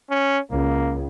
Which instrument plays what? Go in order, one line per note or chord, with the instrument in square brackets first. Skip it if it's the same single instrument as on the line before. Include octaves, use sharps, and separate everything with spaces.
[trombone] C#4
[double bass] C#2 [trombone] A#3